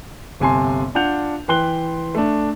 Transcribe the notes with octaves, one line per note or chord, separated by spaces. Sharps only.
G1 C3 G#5 A5 C6
D4 F4 F#5 G6 F7
E3 B4 G5 C6 F#6 G7
A3 D4